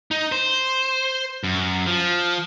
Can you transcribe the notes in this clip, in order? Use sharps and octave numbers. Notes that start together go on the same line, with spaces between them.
D#4
C5
F#2
F3